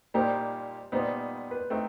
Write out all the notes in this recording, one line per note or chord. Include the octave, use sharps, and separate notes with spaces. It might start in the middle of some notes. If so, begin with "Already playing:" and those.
A#2 G3 A#3 D#4 G4 C5
A#2 G3 B3 D#4 C5
B4
A3 C4 D#4